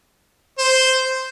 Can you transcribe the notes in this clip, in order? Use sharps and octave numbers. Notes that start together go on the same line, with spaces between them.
C5